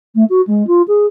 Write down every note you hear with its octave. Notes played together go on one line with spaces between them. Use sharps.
A3
F#4
G#3
F4
G#4